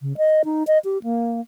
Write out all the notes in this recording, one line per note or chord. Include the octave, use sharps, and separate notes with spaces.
C#3
D#5
D#4
D#5
G4
A#3